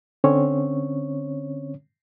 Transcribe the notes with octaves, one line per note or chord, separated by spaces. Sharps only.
D3 C4 C#4 C#5